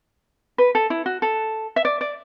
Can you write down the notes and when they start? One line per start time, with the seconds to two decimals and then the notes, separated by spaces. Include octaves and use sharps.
0.58 B4
0.75 A4
0.90 E4
1.06 F#4
1.22 A4
1.76 E5
1.85 D5
2.01 D5